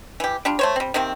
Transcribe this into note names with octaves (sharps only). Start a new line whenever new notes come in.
E3 G4
G3 D4 F4
A3 C5 C#5
G3 C4
C3 D#3 A#3 C4